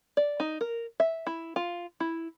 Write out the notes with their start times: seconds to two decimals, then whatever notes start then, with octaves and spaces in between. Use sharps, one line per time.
0.17 D5
0.40 D#4
0.61 A#4
1.00 E5
1.27 E4
1.56 F4
2.00 E4